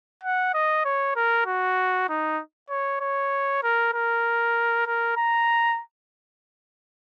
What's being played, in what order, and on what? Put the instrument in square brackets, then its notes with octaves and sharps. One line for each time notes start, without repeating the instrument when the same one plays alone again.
[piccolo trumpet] F#5
D#5
C#5
A#4
F#4
D#4
C#5
C#5
A#4
A#4
A#4
A#5